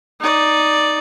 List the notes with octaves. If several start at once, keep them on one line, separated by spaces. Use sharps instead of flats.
D#4 D5